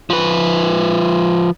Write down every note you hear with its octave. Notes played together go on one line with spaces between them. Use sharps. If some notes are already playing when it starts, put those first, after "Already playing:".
F3 B4